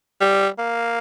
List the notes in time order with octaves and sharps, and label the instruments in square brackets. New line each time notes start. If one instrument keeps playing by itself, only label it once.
[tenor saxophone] G3
A#3